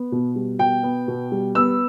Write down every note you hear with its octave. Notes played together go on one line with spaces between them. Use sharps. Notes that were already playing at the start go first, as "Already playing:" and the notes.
Already playing: B3
B2
G3
B2 G5
B3
B2
G3
B3 E6